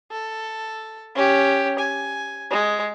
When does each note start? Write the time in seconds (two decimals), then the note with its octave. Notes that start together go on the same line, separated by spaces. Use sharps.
0.12 A4
1.15 C#4 G4
1.79 G#5
2.50 G#3